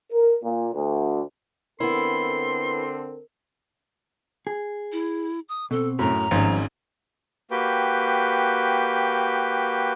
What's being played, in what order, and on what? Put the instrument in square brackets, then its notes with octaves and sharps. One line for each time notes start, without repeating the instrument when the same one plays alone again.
[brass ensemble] A#4
A#2
D2
[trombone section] D3 C4 A4 [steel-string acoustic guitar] B3 E4 [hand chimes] A#4 [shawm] C6
[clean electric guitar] G#4
[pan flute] E4
D#6
[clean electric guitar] B2 C4 [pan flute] A4
[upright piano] F#2 A2 [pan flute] A#5
[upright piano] G#1 G#2 C#4 [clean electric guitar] F3 G3 C5
[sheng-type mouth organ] A#3 F#4 G4 B4 G5